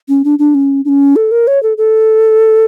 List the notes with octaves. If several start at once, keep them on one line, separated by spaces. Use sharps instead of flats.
C#4
D4
D4
C#4
D4
C#4
A4
A#4
C#5
A4
A4